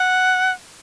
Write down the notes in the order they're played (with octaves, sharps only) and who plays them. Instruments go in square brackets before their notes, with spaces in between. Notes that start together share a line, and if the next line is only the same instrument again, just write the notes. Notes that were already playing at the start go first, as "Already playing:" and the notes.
Already playing: [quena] F#5